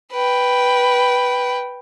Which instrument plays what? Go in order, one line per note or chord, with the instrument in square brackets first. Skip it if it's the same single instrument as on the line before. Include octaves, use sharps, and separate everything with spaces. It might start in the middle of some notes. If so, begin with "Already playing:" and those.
[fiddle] B4 G5